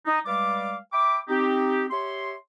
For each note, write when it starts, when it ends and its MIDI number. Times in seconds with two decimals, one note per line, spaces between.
0.06 0.20 63
0.26 0.76 55
0.26 0.76 56
0.26 0.76 71
0.26 0.76 74
0.26 0.76 77
0.26 0.76 86
0.93 1.19 76
0.93 1.19 79
0.93 1.19 83
0.93 1.19 86
1.29 1.86 60
1.29 1.86 63
1.29 1.86 67
1.91 2.35 67
1.91 2.35 73
1.91 2.35 76
1.91 2.35 84